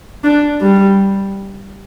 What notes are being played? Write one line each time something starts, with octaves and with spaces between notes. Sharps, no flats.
D4
G3